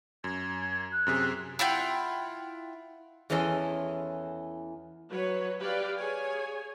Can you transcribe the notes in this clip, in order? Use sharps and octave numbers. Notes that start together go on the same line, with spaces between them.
F#2 G#6
F#6
F#2 C3 G#4
E4 F4 F#5 G5
E2 E3 C#4 A4 D#5 C6
F#3 B4 C#5
G4 B4 D5 F5
G#4 C#5 G#5